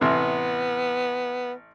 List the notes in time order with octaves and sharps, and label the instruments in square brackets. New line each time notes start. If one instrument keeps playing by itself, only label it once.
[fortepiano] A1 C3 [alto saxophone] B3